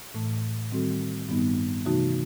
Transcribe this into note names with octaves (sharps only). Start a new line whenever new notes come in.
A2 E3 A3
D#3 G3 C4 F#4 A4
G2 D#3 G3 B3 D#4
C3 E3 A3 D#4 F#4